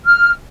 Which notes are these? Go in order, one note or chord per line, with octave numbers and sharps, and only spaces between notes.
F6